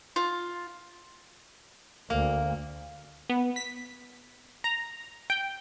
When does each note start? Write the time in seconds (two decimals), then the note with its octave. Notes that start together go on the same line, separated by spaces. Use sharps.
0.16 F4
2.10 D2 A#3
3.30 B3
3.56 B6
4.64 A#5
5.30 G5